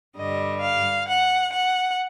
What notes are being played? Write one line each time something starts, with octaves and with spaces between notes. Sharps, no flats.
G2 D3 G3 D#5
F5
F#5
F#5